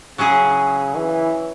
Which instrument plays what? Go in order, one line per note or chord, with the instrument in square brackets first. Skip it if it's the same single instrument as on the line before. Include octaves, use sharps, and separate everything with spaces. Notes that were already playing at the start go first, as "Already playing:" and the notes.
[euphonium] C#3 [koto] F#3 C#4 E4 G#4
[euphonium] E3